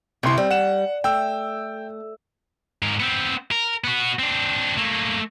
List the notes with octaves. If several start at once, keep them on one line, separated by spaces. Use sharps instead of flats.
G1 C3 E4 C6
G3 C4
F#5 E7
A3 G5 E6
G#2 A#4
B3 C4
A#4
B3 F#4
C4 D4
A3 A#3